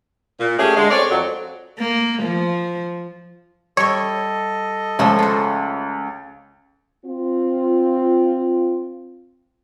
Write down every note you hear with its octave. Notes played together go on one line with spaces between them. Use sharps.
A#2
A3 C#4 G4 G#4
D3 G#3
C4 C#5 D5
F2 F#3
A#3
F3
G3 A4 C#5 D#5 E5
C#2 F3 A3 C#4
F4 F#4
C4 F4